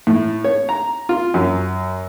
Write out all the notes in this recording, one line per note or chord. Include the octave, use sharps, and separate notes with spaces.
A2
C#5
A#5
F4
F#2